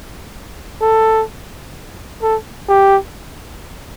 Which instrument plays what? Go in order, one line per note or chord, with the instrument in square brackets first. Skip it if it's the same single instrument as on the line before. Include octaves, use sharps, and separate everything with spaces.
[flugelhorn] A4
A4
G4